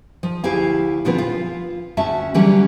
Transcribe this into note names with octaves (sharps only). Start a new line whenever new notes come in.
F3
D2 E4 G4 F5 G#5
A#2 D3 F3 B3 C4 B4
F4
D2 C#4 F#4 E5 A5
D3 E3 F#3 G3 C#4